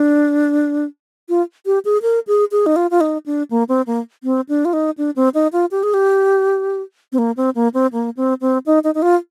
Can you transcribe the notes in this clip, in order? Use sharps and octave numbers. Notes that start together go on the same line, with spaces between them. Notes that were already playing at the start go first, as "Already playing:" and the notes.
Already playing: D4
F4
G4
G#4
A#4
G#4
G#4
D#4
F4
F4
D#4
D4
A#3
C4
A#3
C4
D4
F4
D#4
D4
C4
D#4
F4
G4
G#4
G4
C4
A#3
C4
A#3
C4
A#3
C4
C4
D#4
D#4
D#4
F4